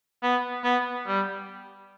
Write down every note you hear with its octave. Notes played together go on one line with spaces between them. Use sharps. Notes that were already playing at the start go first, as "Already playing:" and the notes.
B3
B3
G3